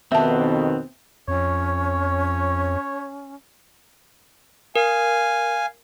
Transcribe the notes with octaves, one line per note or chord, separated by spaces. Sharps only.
F2 B2 D#3 B3 C4 E5 A5
F2 C#4 C#5
A#4 F5 G#5